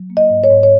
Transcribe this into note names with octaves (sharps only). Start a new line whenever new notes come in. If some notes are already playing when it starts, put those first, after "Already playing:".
Already playing: F#3
A#3
D#5
G#2
C#5
G#2
C#5